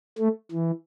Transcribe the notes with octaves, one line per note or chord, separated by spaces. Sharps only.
A3
E3